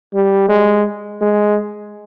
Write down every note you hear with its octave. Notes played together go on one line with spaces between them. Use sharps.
G3
G#3
G#3